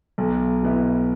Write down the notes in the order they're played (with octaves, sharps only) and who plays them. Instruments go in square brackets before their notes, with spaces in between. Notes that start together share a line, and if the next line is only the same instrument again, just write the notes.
[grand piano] B1
B2 B3 E4